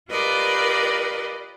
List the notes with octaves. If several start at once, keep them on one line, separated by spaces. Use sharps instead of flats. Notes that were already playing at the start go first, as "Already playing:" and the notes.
F4 G4 A#4 B4 D5 D#5